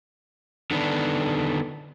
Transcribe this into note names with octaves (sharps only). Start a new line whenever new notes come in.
D3 D#3 B3 D4